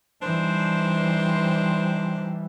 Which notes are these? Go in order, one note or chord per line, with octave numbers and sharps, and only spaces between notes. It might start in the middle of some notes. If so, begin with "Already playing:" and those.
E3 G3 D4 D#4 C5